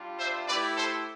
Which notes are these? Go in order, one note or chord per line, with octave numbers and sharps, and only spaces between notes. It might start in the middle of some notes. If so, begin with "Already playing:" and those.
Already playing: G3 D4 F4
C5 E5
A3 E4 G4 B4 D5
A4 C5